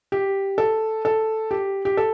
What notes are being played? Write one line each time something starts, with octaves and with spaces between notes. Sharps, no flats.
G4
A4
A4
G4
G4
A4